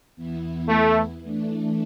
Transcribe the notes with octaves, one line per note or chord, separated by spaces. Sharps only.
E2 E3 B3 E4
A3
E3 A3 D4